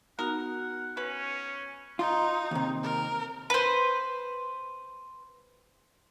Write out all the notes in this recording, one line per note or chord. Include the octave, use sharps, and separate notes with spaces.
B3 D#4 F#4 A#4 F#5
C#4 B4
D#4 F4
D#2 C3
A#4
B4 C5